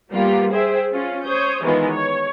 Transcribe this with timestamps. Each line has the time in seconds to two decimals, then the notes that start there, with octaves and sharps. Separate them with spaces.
0.11 G3 A#3 B3 F4 G4
0.51 G#4 C5 E5 G5
0.91 C#4 F4
1.24 C5 C#5 D#6 G6
1.63 D#3 E3 G#3 B3 D#4 F4
1.92 C#5